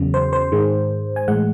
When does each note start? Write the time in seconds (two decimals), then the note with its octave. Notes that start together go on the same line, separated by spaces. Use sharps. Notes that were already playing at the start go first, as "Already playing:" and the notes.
Already playing: E2 C#3 F#3
0.14 C5
0.33 C5
0.52 G#2 D#3 G#3
1.16 G#5
1.27 A2 E3 G#3 F#5